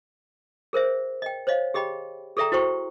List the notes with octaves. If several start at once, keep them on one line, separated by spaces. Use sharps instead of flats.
G#4 A#4 C5 E5
D#5 G5
C5 C#5 D#5 F5
G4 G#4 D#5 G5 B5
G#4 A4 D5 E5 G5 A#5
E4 F#4 C5 G5 C#6